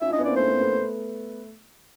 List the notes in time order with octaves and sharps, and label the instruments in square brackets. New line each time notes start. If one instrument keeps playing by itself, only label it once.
[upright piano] C#4 D#4 F4 [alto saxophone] E5
[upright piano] D4 E4 [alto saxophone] D#5
[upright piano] B3 C#4
[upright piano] A#3 C4 [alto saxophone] D5
[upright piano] A3 B3 [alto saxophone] C5
[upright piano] A#3 C4
A3 B3